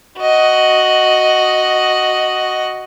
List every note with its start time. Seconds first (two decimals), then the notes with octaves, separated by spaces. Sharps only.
0.19 F#4 D#5